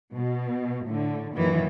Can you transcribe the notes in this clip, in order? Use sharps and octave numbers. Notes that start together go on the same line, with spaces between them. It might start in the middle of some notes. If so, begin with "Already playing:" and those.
B2
A2 D3
F#2 A#2 D#3 E3 F#3